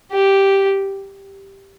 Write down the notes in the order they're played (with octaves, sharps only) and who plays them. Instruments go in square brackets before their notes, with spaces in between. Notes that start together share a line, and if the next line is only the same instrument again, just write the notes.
[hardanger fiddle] G4